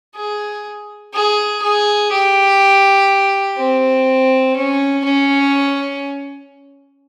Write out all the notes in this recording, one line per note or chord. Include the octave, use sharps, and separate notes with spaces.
G#4
G#4
G#4
G4
C4
C#4
C#4